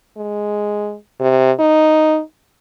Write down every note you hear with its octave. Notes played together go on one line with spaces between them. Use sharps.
G#3
C3
D#4